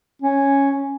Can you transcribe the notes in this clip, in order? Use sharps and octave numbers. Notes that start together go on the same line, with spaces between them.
C#4